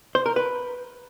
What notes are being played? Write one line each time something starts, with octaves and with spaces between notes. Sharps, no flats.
C5
A#4
B4